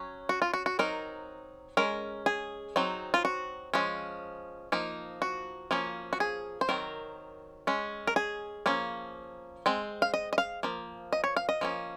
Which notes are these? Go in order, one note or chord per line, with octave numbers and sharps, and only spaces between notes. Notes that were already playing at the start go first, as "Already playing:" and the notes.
Already playing: F#3 C#4
F#4
F4
F#4
F#4
F#3 C4 D#4 A#4
G#3 C#4 A#4
G#4
F#3 C4 D#4
F4
F#4
F3 G#3 C#4
F3 A#3 D#4
F#4
F3 A#3 C#4
F#4
G#4
C5
D#3 F#3 C4 A#4
G#3 C#4
A#4
G#4
F3 A#3 C#4
G#3 C4
F5
D#5
D#5
F5
F3 A#3
D#5
C#5
F5
D#5
F3 A#3 C#4